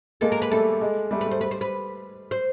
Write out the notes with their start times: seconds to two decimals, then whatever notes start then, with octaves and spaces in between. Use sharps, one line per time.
0.21 G#3 A#3 A4
0.32 A#4
0.42 B4
0.51 G3 A3 A4
0.81 G#3
1.11 G3 A3
1.21 B4
1.27 G3 C5
1.41 G3 B4
1.51 C5
1.61 B4
2.31 C5